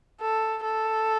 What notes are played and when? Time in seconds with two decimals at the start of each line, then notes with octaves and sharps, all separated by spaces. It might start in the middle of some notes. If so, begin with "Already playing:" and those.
0.21 A4
0.64 A4